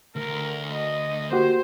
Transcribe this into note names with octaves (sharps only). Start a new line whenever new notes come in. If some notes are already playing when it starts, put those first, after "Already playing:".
D2 A#4
D#5
A#3 F#4 G4 C5